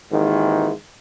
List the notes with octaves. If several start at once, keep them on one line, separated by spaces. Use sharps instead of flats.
G#1 D#2 G#2 D#3 E3